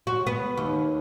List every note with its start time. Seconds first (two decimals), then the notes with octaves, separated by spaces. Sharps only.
0.07 F#4
0.27 B3
0.57 D#2